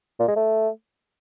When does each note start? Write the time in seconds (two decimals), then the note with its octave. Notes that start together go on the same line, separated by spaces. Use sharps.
0.19 A#2
0.28 G#3
0.36 A3